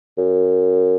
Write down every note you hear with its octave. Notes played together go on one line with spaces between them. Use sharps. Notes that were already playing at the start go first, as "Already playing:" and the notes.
F#2